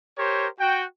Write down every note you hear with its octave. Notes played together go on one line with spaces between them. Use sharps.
G4 A#4 C5 C#5
F#4 G5